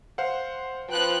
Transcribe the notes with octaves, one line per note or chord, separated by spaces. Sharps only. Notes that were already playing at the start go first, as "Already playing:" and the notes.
C5 F5 F#5
F3 B4 G5 F#6